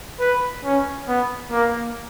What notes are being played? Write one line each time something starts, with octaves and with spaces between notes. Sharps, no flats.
B4
C#4
B3
A#3